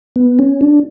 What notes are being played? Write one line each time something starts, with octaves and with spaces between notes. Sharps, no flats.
B3
C#4
D4